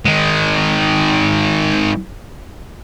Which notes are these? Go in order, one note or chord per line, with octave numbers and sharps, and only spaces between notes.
D#3 G#3